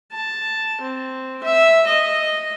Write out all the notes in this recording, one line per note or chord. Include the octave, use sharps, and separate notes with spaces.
A5
C4
E5
D#5